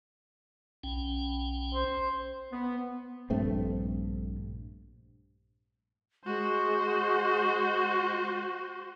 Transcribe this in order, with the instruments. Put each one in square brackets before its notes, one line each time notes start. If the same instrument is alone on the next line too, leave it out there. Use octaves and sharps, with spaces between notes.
[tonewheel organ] B1 C#4 G5
[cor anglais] C5
[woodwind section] B3
[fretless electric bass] A#1 G2 A3 C4
[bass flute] G#3 [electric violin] F#4 C5